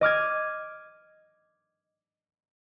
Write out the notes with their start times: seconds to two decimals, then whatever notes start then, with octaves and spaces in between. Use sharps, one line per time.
0.01 D#5 D6 F6 G#6